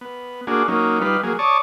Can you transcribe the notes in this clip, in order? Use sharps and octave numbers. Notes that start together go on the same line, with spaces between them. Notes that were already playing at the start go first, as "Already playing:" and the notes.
B3
A#3 D4 F#4 G#4
F#3 A#3 C#4 D#4
G3 D#4 F4 B4
F#3 A#3 G#4
C#5 D5 A5 C#6 D#6